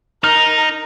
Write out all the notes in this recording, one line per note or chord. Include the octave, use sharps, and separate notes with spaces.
D#4 A#4 F6